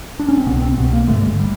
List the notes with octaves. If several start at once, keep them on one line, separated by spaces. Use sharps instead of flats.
D4
C#4
C4
C2 B2 B3
C4
C2 B2 B3
A#3
G#1 G2 D3 A3
G#3
G3